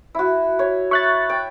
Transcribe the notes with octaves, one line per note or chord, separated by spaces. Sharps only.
E4 F#4
C#5
E5 C#6 F#6 A6
G5